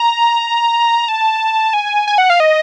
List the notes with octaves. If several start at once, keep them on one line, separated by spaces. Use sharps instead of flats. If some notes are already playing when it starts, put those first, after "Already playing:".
Already playing: A#5
A5
G#5
G#5
F#5
F5
D#5